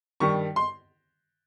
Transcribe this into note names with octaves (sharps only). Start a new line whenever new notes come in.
G2 D#3 G3 C#6
C6